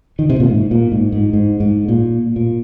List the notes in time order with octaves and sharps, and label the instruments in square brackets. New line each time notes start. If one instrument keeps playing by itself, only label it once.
[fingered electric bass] D#3
C3
A#2
G#2
A#2
G#2
G#2
G#2
G#2
A#2
A#2